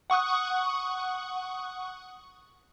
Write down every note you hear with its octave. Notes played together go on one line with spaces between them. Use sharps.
F#5 C#6 D#6 F#6